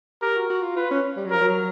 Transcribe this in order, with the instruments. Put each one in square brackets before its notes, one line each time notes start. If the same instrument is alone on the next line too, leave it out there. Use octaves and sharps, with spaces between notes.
[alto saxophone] G4 [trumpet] A#4
[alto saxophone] F#4
F#4
F4
[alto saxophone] F4 [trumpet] B4
[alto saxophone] C#4
G3
F#3
[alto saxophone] F3 [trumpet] A#4
[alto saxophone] F#3